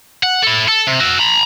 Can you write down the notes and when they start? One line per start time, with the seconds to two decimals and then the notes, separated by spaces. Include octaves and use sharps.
0.23 F#5
0.43 E4 A4
0.68 A4
0.87 C3
1.00 F#4 E5
1.19 A#5 B5